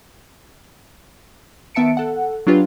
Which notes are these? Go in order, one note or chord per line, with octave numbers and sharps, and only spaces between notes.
D#3 B3 E5 A5 C#7 D7
A4 F#5
F#3 D4 F4 G4 B4